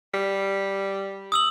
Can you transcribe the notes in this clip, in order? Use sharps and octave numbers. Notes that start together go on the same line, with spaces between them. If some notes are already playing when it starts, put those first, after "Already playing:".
G3
D#6 E6 F#7